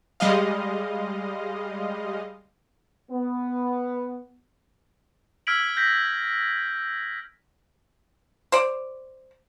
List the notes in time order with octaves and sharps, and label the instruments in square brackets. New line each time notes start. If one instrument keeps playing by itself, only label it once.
[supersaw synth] G3 G#3 D#5 F5
[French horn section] B3
[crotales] E6 F6 G#6 B6 D7 F#7
G6 A#6 B6
[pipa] C5 D5